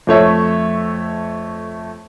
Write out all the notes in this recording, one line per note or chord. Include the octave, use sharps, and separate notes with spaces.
F2 A3 C#5 E5